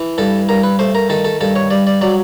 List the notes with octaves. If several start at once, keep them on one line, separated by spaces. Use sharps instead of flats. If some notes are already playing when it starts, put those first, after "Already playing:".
Already playing: E3
G2 A4
G2 A#4
B4
A3 C5
A#4
D#3 A4
A4
G2 A4
C#5
G2 D5
D5
F#3 D5